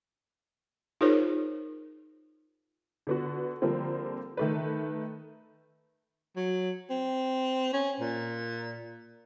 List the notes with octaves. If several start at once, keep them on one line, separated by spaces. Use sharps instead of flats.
D#4 F4 G#4 A#4 C5 C#5
D3 B3 F#4
D3 F3 G3 A#3 C4
D#3 A3 B4
F#3
C4
C#4
A#2